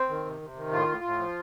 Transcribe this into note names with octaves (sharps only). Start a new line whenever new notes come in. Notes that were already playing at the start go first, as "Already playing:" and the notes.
Already playing: C4
D#3
C3
C3
D#3
A2 F4
A2
A2
F3